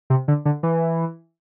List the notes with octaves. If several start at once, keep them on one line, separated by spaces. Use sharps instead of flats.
C3
D3
D3
E3